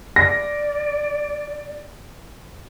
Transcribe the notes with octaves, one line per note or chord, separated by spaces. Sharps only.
D5 A#6